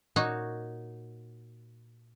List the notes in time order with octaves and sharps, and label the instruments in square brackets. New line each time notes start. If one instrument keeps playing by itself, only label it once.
[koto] A#2 D#4 F#4 C#5